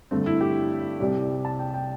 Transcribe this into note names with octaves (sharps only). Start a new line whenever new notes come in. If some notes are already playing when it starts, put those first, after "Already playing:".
G2 D3 A3 C4
E4
G4
C2 C3 G3
A5
G5
G5